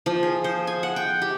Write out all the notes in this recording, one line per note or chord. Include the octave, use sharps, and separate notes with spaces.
F3
G#4
C5
G#5
F#5
G5
G4